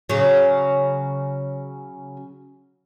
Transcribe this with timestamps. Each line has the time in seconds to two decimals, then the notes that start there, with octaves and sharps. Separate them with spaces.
0.09 C#3 F#3